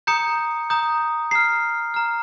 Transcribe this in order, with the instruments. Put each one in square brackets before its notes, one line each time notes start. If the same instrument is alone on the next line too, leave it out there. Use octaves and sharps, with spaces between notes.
[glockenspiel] A#5 D#6 G6 C#7
A#5 D#6 G6
A#5 F6 C7
A#5 F6